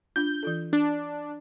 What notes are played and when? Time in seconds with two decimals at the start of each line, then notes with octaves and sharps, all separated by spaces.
0.16 D4 F4 G6
0.43 E3 F4 A4
0.73 D4